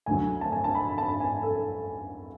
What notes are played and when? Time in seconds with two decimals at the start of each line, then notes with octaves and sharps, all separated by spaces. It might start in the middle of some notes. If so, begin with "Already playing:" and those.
0.06 D2 D3 F#3 G#5
0.41 A5
0.52 G#5
0.64 A5
0.75 B5
0.98 A5
1.20 G#5
1.43 A4